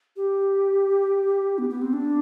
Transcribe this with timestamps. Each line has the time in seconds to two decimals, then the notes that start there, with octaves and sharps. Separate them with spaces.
0.16 G4
1.58 B3
1.70 B3
1.82 C4
1.93 D4